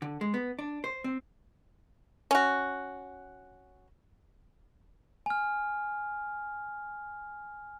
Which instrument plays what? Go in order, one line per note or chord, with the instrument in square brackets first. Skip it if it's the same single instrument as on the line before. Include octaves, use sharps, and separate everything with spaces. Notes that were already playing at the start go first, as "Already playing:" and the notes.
[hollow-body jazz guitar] D3
G#3
B3
D4
C5
C4
[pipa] C#4 F#4
[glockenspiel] G#5 F6